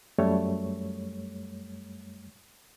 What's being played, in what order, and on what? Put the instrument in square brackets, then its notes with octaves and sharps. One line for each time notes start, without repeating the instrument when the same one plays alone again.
[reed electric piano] F#2 G3 A3 C#5